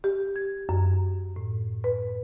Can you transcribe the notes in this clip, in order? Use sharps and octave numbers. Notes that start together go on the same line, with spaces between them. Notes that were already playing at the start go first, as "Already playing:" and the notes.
G4
G#6
F#2
A2
B4